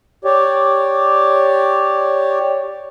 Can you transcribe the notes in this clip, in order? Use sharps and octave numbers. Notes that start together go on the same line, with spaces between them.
G4 C#5 D5